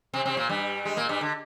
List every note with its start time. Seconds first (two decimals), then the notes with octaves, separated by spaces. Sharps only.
0.14 C3 C4
0.26 C3 C4
0.37 A#2 A#3
0.49 G2 G3
0.85 G#3
0.97 A#2 A#3
1.09 G2 G3
1.21 D3